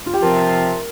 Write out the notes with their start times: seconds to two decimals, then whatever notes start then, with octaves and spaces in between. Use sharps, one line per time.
0.06 F4
0.14 G4
0.22 C3 F3 C4 F4 A#4